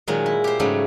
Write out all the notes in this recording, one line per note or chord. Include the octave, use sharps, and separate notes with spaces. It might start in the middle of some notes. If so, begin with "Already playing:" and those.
A#2 D#3 F#3 G#3
E4
G4 C5
G#2 C#3 F#3 G3 A3